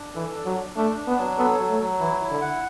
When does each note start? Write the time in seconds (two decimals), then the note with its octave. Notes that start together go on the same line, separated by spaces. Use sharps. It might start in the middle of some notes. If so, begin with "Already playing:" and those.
Already playing: D4
0.14 E3 A4
0.35 D4
0.45 F#3
0.56 D4
0.76 A3 D4
0.97 D4
1.07 B3
1.18 F#3
1.38 B3 A4
1.59 F#3
1.69 A3
1.80 F#3
2.00 E3 E4
2.20 E4
2.31 D3
2.41 F#5